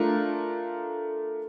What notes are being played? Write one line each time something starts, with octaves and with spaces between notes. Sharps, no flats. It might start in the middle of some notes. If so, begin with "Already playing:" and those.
Already playing: A3 D4 F4 A#4